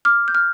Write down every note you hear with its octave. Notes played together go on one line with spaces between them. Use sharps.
D6 F6
G6
F6